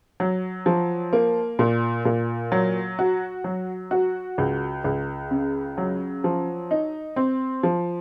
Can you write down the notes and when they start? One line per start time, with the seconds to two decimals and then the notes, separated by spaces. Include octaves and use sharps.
0.20 F#3
0.66 F3
1.13 A#3
1.59 A#2
2.05 A#2
2.52 F#3
2.99 F#4
3.44 F#3
3.91 F#4
4.38 C#2
4.84 C#2
5.31 C#3
5.78 F#3
6.24 F3
6.71 D#4
7.16 C4
7.63 F3